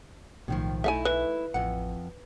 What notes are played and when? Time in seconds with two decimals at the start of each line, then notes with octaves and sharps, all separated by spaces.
0.48 B1 A2 D#3 F3
0.84 A3 D#4 E4 E5 F5 G#5
1.05 E3 B4
1.54 A1 F2 F#5